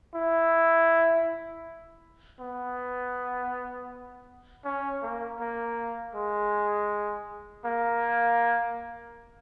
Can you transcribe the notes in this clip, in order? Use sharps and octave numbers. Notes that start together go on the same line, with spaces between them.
E4
B3
C#4
A#3
A#3
G#3
A#3